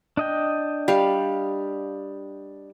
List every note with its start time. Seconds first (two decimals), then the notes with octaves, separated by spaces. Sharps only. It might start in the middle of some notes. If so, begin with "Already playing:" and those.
0.17 D4 D#5 G5
0.88 G3 F5